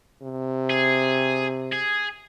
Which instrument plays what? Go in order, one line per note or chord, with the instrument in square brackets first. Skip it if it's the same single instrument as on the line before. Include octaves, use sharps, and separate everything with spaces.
[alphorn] C3
[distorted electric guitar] G#4
G#4